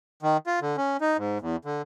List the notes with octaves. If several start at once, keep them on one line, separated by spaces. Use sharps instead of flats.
D#3
F4
D3
C#4
D#4
G#2
E2
D3